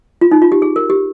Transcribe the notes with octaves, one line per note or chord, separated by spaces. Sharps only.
F4
D#4
F4
G4
G#4
A#4
G4